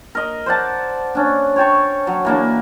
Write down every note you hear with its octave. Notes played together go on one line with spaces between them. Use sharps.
A#4 D#5
C5 D5 F#5 A5
C#4 D4
C#5 G5 A5 C#6
F#3
E3 A#3 D4